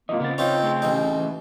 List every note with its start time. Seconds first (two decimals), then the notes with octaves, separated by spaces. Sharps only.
0.09 G#2 C3 E3 A#3 F4 D#5
0.20 C#3 B3 C4 A6
0.38 C4 D#4 F4 B4 C#5
0.63 A3 G#4
0.82 A1 D#4
1.16 E3